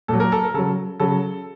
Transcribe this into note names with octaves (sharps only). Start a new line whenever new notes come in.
A#2 F#3 A4
A#4
A4
A#4
C#3 F#3 A4
C#3 F#3 A4